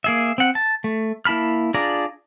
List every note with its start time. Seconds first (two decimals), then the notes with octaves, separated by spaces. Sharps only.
0.04 A#3 G#4 E5
0.38 C4 F#5
0.55 A5
0.84 A3
1.25 A#3 E4 A5 B5 F6
1.74 D4 F4 G#4 D5 A#5